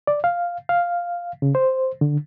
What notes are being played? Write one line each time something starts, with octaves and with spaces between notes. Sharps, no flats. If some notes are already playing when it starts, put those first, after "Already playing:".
D5
F5
F5
C#3
C5
D3